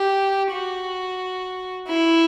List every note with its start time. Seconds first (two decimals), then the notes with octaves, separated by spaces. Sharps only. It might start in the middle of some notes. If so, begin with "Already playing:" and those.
Already playing: G4
0.52 F#4
1.88 E4